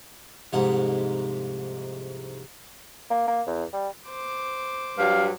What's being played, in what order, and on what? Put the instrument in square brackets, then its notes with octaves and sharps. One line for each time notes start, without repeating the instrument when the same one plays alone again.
[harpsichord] C2 F2 G#2 D#4 F#5
[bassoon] A#3
A#3
E2
G3
[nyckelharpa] C5 D6
[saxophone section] G2 F#3 G3 [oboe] F5